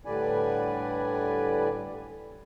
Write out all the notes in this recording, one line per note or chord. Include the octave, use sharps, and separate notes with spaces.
A2 D3 G3 B4 D5 G#5